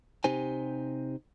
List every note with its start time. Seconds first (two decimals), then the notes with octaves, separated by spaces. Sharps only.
0.24 C3 D#4 G4 C5 G#5